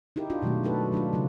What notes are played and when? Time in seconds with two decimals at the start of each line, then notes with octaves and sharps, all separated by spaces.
0.16 D#4 E4 G4 A#4
0.30 D4 F4 F#4
0.42 B2 D#3 F#3 G#3 A3
0.63 D4 F#4 A4 B4
0.92 F#3 D4 D#4 F4
1.13 C#3 F#3 E4